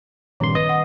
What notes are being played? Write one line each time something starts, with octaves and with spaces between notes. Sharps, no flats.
A#1 G2 D#3 C4 C6
B4 D#5 D#6
F#5